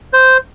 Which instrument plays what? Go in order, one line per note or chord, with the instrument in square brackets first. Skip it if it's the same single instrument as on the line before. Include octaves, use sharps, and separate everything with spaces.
[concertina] C5